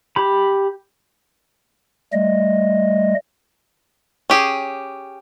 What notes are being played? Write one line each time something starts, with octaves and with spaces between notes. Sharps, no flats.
G4 B5
G3 A3 D#5
C#4 G4 G#4